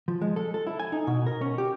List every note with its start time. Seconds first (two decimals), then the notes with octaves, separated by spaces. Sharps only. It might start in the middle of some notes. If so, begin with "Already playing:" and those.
0.08 F3
0.21 G#3
0.36 A4
0.54 A4
0.67 E4
0.80 G#5
0.92 D#4
1.07 B2
1.26 A#4
1.41 C#4
1.58 G4